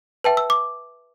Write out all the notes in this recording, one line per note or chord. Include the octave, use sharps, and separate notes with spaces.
B4 E5 G5 A5
E6
D6